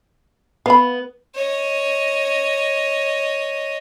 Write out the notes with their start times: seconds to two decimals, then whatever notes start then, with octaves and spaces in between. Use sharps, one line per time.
0.66 B3 F5 B5
1.35 C#5 D#5